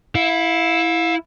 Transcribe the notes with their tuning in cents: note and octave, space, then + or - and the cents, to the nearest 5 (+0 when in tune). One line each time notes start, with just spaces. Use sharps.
E4 +0 F5 +35